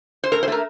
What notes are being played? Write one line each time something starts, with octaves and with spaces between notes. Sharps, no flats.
C5
A2 A#4
C5
A3 A#4